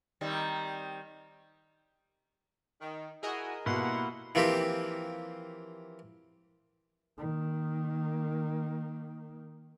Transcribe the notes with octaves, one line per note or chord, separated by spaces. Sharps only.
D#3 G3 C4
D#3
E4 F#4 G#4 A#4 D#5 G#5
B2 G3 A#3 E4 F#5 C6
E3 F3 A#3 C4 G4
D#3 A#3